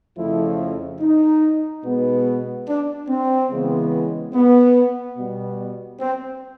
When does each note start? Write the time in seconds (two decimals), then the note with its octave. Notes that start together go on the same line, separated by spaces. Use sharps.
0.17 F2 C#3 F3 A3 E4
1.01 D#4
1.84 B2 G#3 B3
2.67 D4
3.08 C4
3.50 C#3 E3 G#3 B3
4.34 B3
5.17 B2 G3 B3
6.00 C4